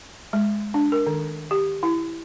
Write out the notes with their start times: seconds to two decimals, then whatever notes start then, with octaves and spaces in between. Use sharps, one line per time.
0.33 G#3
0.74 D4
0.92 A#4
1.07 D#3
1.51 G4
1.83 E4